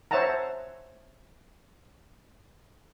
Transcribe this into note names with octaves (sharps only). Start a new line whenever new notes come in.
C5 C#5 E5 F#5 A5 A#5